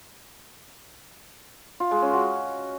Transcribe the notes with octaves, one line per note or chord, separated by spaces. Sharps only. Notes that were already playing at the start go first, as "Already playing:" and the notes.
F4
G#3
C#4
F#4